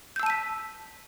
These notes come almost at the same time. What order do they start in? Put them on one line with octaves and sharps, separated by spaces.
G6 E6 A5 D#7 B6